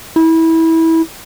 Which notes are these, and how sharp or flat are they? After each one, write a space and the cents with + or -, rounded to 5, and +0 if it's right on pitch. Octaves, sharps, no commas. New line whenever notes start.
E4 -20